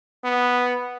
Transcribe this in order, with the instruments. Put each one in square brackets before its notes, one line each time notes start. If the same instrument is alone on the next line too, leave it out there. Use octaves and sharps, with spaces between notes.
[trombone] B3